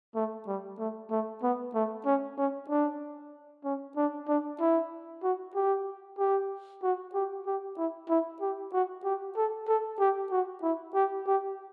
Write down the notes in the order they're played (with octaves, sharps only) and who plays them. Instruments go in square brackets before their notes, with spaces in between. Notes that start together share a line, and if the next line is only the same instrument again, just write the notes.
[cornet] A3
G3
A3
A3
B3
A3
C#4
C#4
D4
C#4
D4
D4
E4
F#4
G4
G4
F#4
G4
G4
E4
E4
G4
F#4
G4
A4
A4
G4
F#4
E4
G4
G4